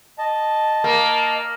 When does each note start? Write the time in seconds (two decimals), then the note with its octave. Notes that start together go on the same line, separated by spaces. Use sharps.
0.18 D#5 A5
0.84 A#3